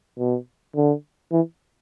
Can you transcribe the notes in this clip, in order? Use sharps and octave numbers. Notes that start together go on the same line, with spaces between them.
B2
D3
E3